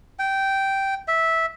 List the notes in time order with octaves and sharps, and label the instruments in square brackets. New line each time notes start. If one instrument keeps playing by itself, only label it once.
[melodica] G5
E5